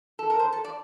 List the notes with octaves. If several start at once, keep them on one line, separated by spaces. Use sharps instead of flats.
A4
A#4
C5
A4
D5